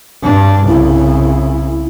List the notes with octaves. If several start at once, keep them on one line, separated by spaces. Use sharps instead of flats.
G2 D4
C2 C#3 E4